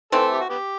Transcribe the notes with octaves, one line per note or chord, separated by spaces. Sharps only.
E3 A3 C4 A4
G4
F#4
B3 G4